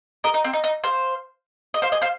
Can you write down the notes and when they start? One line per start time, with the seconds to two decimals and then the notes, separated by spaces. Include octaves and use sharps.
0.24 A#4 D#5
0.34 D#4
0.44 C4
0.53 D#4
0.64 D#4
0.84 C5 F5
1.74 D#5
1.82 C5 F5
1.92 D#5 G#5
2.02 C5 F5